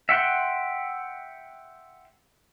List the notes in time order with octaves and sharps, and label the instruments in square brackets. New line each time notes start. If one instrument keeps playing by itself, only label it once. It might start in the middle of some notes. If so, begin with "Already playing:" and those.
[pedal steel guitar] E5 F#5 G5 C6